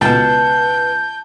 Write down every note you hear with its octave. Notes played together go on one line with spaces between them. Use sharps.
C#2 B2 B4 A5 G6